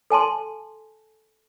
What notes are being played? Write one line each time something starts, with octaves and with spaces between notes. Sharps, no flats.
A4 G#5 A5 C6